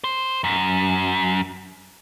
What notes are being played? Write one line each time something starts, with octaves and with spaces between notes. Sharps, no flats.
C5
F#2